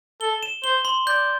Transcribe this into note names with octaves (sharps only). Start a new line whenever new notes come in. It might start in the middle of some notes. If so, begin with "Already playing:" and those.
A4 G7
E7
C5 G7
C6
D5 G6